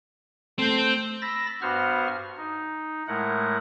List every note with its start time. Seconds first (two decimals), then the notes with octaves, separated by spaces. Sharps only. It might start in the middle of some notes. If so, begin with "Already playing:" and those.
0.59 A3 C4 A4 G6
1.21 B5 E6 A6 A#6
1.61 G2 B3 F#4 C5 C#6 F6
2.37 D#4
3.08 A2 G#3 A3 A#4 F#5